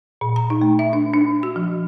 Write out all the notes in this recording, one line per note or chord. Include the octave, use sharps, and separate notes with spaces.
A#2
A#5
D#4
A3
E5
D4
D4
F#4
F3